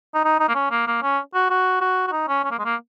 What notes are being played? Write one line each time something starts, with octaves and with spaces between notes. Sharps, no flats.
D#4
D#4
D#4
A#3
C#4
A#3
A#3
C#4
F#4
F#4
F#4
F#4
D#4
C#4
C#4
A#3
G#3
A#3